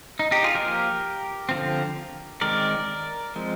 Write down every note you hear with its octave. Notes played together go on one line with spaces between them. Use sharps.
D#4
D#4 G4
F4 G#4
F3 A#3 G4 A#4
D3 F3 C4
D#3 G#3 C4 A#4 D5
F3 G#3 C4